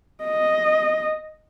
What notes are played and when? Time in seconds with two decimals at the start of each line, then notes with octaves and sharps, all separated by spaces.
0.24 D#5